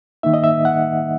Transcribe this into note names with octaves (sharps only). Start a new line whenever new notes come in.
D#3 A#3 D#4 E5
D#5
E5
F#5